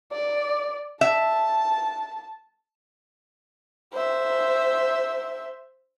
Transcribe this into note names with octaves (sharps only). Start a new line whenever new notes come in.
D5
E5 A5
C5 E5